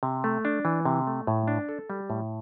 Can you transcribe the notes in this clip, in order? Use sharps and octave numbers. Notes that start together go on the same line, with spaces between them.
C3
A3
D4
E3
C3
A3
A2
D4
A4
G3
A2